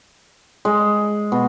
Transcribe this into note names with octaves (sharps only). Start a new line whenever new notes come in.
G#3
B2